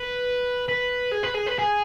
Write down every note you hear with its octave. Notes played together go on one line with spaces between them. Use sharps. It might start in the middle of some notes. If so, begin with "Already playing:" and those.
Already playing: B4
B4
G#4
B4
G#4
B4
G#4